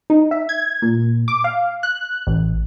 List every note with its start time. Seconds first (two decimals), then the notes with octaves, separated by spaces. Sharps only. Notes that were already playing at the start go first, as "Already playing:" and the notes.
0.10 D#4
0.31 E5
0.49 G#6
0.82 A#2
1.28 D6
1.44 F5
1.83 F#6
2.27 A1